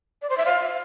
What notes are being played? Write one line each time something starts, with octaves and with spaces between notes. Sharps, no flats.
D5
C5
E5
F5